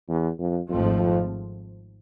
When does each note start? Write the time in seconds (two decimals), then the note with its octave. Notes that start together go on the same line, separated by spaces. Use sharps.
0.08 E2
0.39 F2
0.69 G#1 F2 G#2 F3 A3 C4
0.99 F2